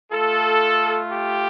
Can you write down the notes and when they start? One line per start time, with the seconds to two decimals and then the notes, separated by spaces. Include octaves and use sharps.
0.11 A3 F4 A4
1.10 G4